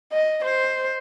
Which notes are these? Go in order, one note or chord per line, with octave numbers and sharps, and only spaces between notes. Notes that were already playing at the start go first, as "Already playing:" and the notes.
D#5
C5